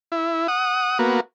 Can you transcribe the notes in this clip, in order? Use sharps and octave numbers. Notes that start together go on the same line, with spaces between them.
E4
F#5 D#6
A#3 B3 F#4